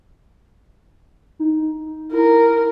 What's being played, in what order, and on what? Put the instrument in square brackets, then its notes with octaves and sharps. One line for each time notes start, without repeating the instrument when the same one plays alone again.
[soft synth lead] D#4
[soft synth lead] E4 [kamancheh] A#4